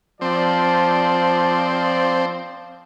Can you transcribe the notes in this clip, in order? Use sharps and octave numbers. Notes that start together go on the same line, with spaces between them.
F3 C4 D5